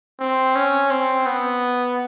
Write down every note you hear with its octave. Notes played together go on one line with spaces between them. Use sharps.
C4
C#4
C4
B3